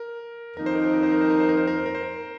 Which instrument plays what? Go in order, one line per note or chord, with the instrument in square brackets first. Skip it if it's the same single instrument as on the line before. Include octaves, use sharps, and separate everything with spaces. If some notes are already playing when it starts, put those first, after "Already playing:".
Already playing: [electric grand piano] A#4
[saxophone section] F2 D#3 A#3 D#4 [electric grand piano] A#4
[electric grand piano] C5
A#4
C5
A#4
C5
A#4
C5
A#4
C5
A#4
C5
A#4
C5
A#4
C5
A#4